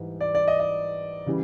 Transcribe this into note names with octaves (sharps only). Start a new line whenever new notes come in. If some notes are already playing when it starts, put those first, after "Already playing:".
Already playing: G#2 E3 G3
D5
D5
D#5
D#5
C#3 E3 G3